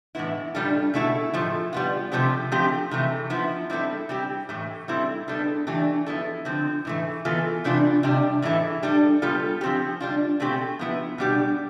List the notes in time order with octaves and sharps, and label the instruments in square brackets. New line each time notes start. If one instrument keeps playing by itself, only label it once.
[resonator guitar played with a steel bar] A2 E3 B3 E4
A2 G3 D4 F4 A4
B2 A3 E4 A4
A2 F3 A3
G3 B3 F4
C3 F3 A3 C4 G4
F3 A3 C4 G4
C3 E3 A3
F3 B3 E4
G3 C4 E4 A4
G3 C4 G4
A2 E3 A3
G3 C4 E4 A4
G3 B3 D4 A4
E3 A3 D4 G4
F3 B3 E4 A4
D3 F3 C4
A2 E3 A3
E3 B3 F4 A4
C3 E3 A3 D4 F4
C3 G3 D4 G4
A2 E3 A3 E4 A4
G3 D4 A4
G3 B3 F4 A4
F3 C4 G4
G3 D4 F4
B2 A3 C4 G4
F3 B3 E4
B2 G3 D4 G4